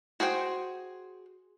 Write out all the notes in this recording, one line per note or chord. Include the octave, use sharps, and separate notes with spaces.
F#4 G#4 C5 G5